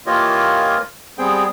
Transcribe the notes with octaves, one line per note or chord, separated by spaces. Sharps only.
E3 A#3 F4 G4 C#5 D#5
G3 B3 C4 G#4 G5